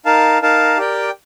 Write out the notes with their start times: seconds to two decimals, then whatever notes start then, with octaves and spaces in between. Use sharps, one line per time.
0.06 D#4 A#4 F5 A5
0.42 D#4 A#4 F5 A5
0.78 G4 A#4 D5 G5